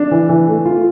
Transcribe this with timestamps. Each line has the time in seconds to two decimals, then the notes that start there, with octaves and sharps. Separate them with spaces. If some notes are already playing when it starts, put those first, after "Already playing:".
Already playing: D4
0.11 E3
0.29 E3
0.48 A3
0.65 F4